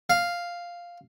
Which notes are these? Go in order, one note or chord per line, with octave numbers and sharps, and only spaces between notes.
F5